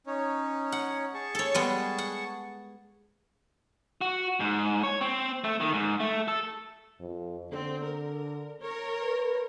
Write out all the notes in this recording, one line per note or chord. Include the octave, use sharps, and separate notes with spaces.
C#4 D#4 C#5
F#5
G#4 A5 C#6
A4 C#5
G3 G#3 B3
F#5
F#4
G#2
C#5
C4
A3
D#3
G#2
A3
A4
F2
D3 C4
A#4
A#4 C#5
B4